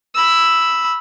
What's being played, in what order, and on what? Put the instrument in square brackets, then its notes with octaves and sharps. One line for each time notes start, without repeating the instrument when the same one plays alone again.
[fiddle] B5 E6